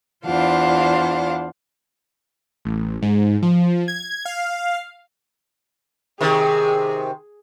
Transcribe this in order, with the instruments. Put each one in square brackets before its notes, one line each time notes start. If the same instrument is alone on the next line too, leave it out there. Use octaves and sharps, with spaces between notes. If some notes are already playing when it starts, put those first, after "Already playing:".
[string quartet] E2 D4 F4 C5 F5 F#5
[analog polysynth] A1
G#2
F3
G#6
F5
[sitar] C3 D#3 [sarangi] G#4